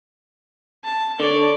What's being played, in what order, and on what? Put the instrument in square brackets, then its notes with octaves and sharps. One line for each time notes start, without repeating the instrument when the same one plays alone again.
[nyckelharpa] A5
[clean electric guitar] D3 [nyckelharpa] C#5 D5